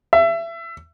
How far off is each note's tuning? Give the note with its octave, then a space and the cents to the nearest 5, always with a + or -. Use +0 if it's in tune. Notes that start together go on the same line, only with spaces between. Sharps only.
E5 +25